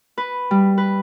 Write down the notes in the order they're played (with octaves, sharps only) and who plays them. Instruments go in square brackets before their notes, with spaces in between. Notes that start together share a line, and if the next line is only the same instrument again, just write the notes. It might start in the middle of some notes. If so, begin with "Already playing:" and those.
[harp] B4
G3
B4